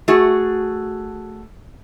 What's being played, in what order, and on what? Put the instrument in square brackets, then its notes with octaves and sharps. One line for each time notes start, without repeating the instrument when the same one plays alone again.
[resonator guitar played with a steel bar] A3 F#4 G#4